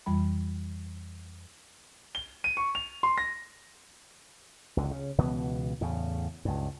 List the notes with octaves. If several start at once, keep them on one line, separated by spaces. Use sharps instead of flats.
F2 E3 G3 B5
G7
D#7
C#6
F7
C6
A#6
C#2 D3
C#3
C#2 B2 E3 B3
E2 A2 C#3
C#2 G2